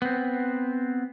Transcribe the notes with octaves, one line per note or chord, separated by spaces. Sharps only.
B3 C4